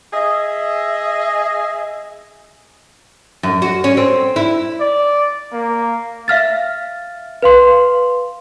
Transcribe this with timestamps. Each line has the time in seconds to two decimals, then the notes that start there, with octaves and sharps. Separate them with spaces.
0.14 G#4 D#5 E5
3.43 F#2
3.62 F#4
3.84 C#4
3.97 C4
4.36 E4
4.81 D5
5.53 A#3
6.28 E5 F5 F6 A6
7.42 B4 F5 C6